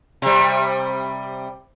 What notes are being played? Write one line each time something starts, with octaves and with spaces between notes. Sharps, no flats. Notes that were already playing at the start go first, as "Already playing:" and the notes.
C3 G3